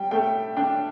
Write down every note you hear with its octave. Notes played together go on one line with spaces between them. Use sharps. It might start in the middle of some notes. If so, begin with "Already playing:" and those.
Already playing: G3 G5
A3 G5
D4 G5